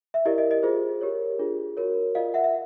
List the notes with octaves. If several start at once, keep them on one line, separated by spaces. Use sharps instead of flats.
E5
E4 G4 A#4 D5 D#5
D#5
D#5
F4 G#4 C5
G4 A#4 C#5
D4 F4 G#4
F#4 A#4 C#5
F4 A#4 D5 D#5 F5
E5 F#5
E5